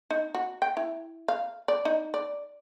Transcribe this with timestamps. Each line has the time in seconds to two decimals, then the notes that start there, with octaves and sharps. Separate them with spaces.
0.11 D#4
0.35 F#4
0.62 G5
0.77 E4
1.28 F5
1.68 D5
1.85 D#4
2.14 D5